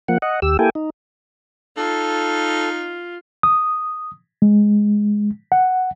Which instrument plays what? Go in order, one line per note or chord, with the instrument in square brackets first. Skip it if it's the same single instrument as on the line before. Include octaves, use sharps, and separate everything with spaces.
[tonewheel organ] F3 A#3 F#5
D#5 F#5
D#2 G4 E6
A#3 E4 G4 A4 G5 G#5
D#4
[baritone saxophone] D#4 [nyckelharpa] F4 [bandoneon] A4
[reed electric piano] D#6
G#3
F#5